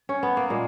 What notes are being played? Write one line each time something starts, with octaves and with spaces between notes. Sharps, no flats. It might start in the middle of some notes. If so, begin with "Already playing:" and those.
Already playing: D#4
C#4
B3
A#3
A#2 G#3